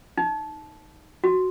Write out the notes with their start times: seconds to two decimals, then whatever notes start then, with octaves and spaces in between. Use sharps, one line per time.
0.17 D#4
1.24 F#4